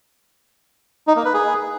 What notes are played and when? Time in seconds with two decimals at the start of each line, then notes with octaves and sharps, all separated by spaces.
1.07 D#4
1.16 A#3
1.25 B4
1.34 G#4